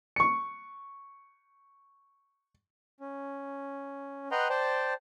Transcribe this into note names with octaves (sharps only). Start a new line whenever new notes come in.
C#6 C#7
C#4
B4 D#5 F#5 G5 A#5 C6
C5 D5 G5 A5